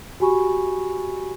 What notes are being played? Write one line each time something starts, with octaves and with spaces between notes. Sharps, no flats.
F#4 G4 G#5 B5 C#6